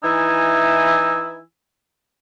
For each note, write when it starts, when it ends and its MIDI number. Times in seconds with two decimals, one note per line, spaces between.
0.03 1.40 52
0.03 1.40 63
0.03 1.40 64
0.03 1.40 80
0.03 1.40 88